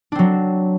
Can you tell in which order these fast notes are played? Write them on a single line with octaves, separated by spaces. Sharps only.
D4 C4 F#3